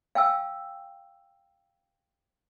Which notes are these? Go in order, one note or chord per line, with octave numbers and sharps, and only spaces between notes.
F5 G5 G#5 E6